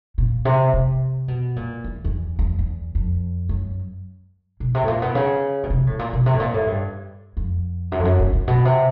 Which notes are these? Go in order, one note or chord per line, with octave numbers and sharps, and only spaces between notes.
A#2
C3
C3
B2
A#2
E2
E2
E2
E2
F2
F#2
B2
C3
A2
A#2
B2
C#3
B2
C3
A2
A#2
B2
C3
A2
A#2
A2
G2
F2
F#2
F2
F#2
G#2
A2
B2
C3